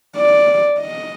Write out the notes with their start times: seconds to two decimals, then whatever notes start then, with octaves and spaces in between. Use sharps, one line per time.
0.16 D5
0.79 D#5